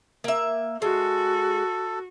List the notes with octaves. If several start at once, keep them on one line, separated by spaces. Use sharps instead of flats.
A#3 E5
G#3 F#4 A4